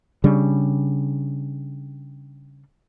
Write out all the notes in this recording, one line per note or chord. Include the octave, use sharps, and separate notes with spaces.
C#3 G3 D4